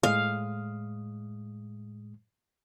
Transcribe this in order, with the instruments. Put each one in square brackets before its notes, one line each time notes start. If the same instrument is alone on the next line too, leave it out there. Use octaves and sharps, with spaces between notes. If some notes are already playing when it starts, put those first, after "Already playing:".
[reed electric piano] A2 G#3 D#6 [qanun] F5